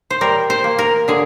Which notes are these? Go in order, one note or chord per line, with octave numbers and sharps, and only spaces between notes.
C5
G3 A#4
C5
A#3
A#4
D3 G#4